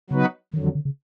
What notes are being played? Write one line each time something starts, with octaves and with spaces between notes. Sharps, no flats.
C#3 F#3 B3 D#4 F#4 B4
F2 D3 D#3 F#3
D#3
D3
C#3